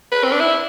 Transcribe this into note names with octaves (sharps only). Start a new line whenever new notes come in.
B4
C4
D4
E4